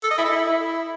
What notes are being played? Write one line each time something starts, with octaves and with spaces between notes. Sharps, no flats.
A4
D#5
E4
A4
E4